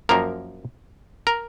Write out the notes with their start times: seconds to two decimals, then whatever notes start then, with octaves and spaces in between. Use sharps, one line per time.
0.09 F#2 F3 A#3 A#4
1.27 A#4